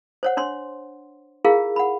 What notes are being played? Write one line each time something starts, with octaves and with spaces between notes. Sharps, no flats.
C5 C#5 F#5
D4 C#5 C6
E4 F4 G#4 A#4 F5
F#5 B5